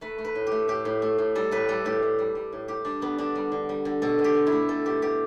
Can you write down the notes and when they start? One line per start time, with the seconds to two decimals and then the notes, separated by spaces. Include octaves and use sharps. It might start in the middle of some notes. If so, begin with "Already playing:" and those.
0.01 A3 B4
0.18 A3
0.24 B4
0.35 A2
0.47 A3 G4
0.68 A2 G4
0.85 A2
1.02 A3
1.18 A2
1.35 G3 A4
1.51 A2 B4
1.68 G3 A4
1.85 A2 G4
2.02 A2
2.19 G3
2.35 G3
2.52 A2
2.68 G3 G4
2.85 G3 D4
3.01 D3 B3
3.18 D3 D4
3.35 G3
3.52 D3
3.69 G3
3.85 D3
4.02 B2 A4
4.19 B2
4.24 G4
4.35 B2
4.47 E4
4.52 A3
4.68 B2 A4
4.85 B2 G4
5.02 B2 G4